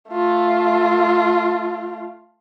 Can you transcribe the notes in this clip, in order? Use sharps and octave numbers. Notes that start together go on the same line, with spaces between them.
A3 F4